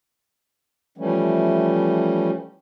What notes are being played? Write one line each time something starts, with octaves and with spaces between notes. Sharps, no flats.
E3 F3 G3 A3 C#4